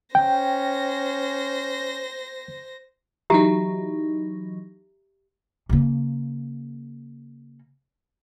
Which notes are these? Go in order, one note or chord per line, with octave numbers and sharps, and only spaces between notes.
C#4 C5 G5 A#6
E3 F#3 D#4 G4 E5 A#5
C#3 A#3